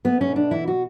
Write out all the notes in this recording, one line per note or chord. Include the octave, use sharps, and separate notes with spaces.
A3 B3
C#4
B2
D4
E3 E4
F#4